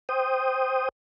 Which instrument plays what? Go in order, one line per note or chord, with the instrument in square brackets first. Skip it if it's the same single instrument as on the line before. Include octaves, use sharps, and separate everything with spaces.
[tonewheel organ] C5 G5 D#6